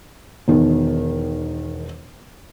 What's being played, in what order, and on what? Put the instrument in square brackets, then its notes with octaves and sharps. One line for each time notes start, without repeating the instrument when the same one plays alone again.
[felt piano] E1 D#3